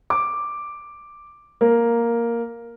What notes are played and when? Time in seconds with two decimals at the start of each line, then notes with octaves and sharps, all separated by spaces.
0.10 D6
1.61 A#3